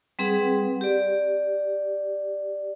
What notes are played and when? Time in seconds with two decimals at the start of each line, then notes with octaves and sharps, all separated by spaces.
0.19 G3 C4 G#4 B4 F#5
0.81 G4 D5